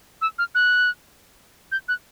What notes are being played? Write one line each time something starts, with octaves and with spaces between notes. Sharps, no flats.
E6
F6
F#6
G6
F#6